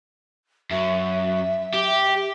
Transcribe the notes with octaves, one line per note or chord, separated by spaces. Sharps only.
F#2 E5
G4
G4